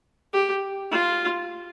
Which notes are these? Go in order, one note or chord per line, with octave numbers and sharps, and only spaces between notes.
G4
F4